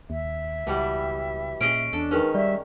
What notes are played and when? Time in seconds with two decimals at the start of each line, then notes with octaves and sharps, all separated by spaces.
0.10 D#2 E5
0.67 C#2 B2 E3 G3
1.61 A#2 C#4 G#4 D#5 D7
1.93 E2 D4 A4
2.11 D#3 G#3 C#4 D#4 A#4 B4
2.35 G3 D5 E5